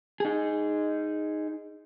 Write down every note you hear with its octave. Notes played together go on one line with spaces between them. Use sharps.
D#4 G#4